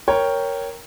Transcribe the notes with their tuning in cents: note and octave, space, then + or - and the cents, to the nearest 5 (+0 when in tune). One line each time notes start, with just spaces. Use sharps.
A#4 +0 C#5 +0 G5 +0